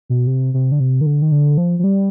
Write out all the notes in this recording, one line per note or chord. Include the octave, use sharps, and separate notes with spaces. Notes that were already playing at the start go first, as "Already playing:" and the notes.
B2
C3
C3
D3
C3
D#3
D3
D#3
D3
F3
F3
G3